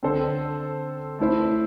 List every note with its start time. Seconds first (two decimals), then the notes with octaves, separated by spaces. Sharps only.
0.03 D3 C4 A4 C5
1.19 A3 E4 C5